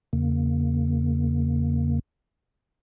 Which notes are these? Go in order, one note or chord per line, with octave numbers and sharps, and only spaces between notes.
E2 C#3 A#3